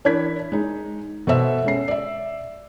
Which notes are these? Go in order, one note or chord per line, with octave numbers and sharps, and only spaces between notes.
E3 D4 E4 A#4 G#6 B6
G#3 D#4
B2 A4 C5 E5 E6
G#3 C#4 C7
D5 E5